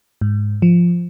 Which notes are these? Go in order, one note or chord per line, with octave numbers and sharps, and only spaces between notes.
G#2
F3